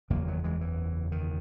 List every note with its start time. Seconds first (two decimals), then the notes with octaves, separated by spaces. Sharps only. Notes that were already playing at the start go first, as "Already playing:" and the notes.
0.10 F#1 E2 C#3 F#3 A#3
0.27 D#3 F#3
0.44 E3 G#3
0.61 E3
1.12 D#3